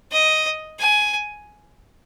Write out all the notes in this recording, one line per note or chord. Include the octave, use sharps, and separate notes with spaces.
D#5
G#5